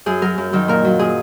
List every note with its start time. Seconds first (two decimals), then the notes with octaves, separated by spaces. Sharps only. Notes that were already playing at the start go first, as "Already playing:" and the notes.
0.06 F#2 G#4
0.22 F#3 A#4
0.38 F#2
0.53 D#3 F#3
0.68 A#2 A#4
0.85 F#3
0.99 A#2 G#4